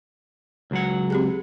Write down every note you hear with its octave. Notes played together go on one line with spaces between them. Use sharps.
C#2 F#3 F#5
C4 G4 G#4